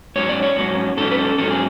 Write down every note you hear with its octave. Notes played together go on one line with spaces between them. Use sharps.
G#2 F#3 C#4 C#5
D5
C#5
G#2 F#3 C#4
G#2 F#3 C#4 A4
B4
A4
G#2 F#3 C#4 A4
G#4